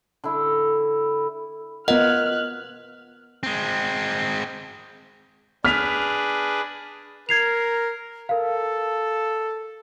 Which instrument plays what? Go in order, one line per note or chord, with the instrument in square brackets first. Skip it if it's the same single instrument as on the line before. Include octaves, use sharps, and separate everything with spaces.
[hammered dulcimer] D3 E4
[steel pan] B3 F4 A#4 [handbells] D#5 F#5 [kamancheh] F6 F#6
[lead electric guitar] G#3 C4
[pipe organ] D4 G#4 B4 [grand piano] F6 B6 F7
[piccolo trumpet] A#4 [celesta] G#6 C7 F7
[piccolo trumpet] A4 [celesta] A#4 F5